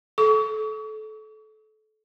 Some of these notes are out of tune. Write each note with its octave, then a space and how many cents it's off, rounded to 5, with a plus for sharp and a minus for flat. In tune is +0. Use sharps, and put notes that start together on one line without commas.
A4 -25 C#6 +40